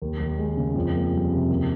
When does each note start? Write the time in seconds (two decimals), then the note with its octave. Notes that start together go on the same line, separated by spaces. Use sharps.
0.02 D#2
0.20 D#2
0.39 G#3
0.57 C#3
0.75 F2
0.94 A#3
1.13 G3
1.31 C3
1.50 D#2